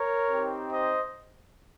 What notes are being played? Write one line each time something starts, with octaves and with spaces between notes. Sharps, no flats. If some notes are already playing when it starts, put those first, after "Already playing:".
Already playing: A#4 C#5
C4 D#4 G4
C5 D#5